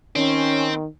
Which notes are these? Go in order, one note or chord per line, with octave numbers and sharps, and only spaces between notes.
D#3 C4 C#4